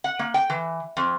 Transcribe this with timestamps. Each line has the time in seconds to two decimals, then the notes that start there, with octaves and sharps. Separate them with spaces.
0.04 F#5
0.19 A#3
0.34 G5
0.50 E3
0.97 F2